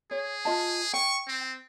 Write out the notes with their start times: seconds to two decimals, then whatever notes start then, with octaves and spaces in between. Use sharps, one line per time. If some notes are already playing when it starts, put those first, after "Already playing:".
0.11 G#4 C#5
0.45 F4 D#5 A5
0.93 G5 C#6
1.28 C4